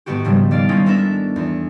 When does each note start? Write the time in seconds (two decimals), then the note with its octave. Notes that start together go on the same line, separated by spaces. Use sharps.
0.06 G#2 D#3 A3 B3 F#4 G4
0.25 G#2 C#3 F3 G3 A3
0.51 D#3 D5 F5 A6
0.69 G#3 A#3 C4 C#4 D#4 E4
0.86 B3 D4 E4 A4 A#4 E5
1.36 E2